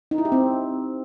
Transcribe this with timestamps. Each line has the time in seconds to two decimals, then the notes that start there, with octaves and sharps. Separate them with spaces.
0.11 D#4
0.18 E4
0.25 G4
0.32 C4